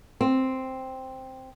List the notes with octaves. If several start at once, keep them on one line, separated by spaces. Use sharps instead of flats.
C4